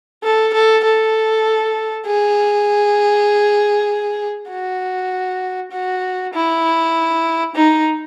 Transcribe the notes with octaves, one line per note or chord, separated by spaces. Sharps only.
A4
A4
A4
G#4
F#4
F#4
E4
D#4